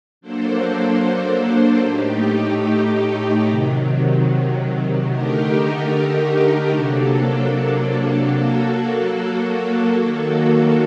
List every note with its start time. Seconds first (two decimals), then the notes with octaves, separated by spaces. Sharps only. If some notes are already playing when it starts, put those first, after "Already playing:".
0.21 F#3 A#3 D4 A4 C5
1.84 A2 A3 D#4 G4
3.46 C3 D#3 F#3
5.09 D3 A3 D#4 G4 A#4
6.71 C3 F#3 A#3 D4 A4
8.34 F#3 A#3 F#4 A4
9.96 D#3 F#3 A#3 F#4 A4